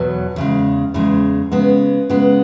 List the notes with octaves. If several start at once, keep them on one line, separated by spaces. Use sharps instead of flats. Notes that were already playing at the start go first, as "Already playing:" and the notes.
Already playing: E2 B2 F#3
E2 C#3 G#3
E2 C#3 G#3
C#3 G#3 B3
C#3 G#3 B3